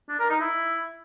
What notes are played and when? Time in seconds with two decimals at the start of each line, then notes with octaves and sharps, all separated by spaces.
0.09 D4
0.19 A#4
0.30 D#4
0.40 E4